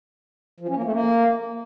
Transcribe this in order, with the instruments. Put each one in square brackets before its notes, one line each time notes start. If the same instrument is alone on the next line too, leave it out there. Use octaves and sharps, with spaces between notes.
[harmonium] F3
C#4
A#3
A3
A#3